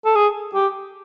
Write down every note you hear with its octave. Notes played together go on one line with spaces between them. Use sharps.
A4
G#4
G4